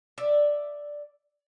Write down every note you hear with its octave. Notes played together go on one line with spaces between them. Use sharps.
D5 E5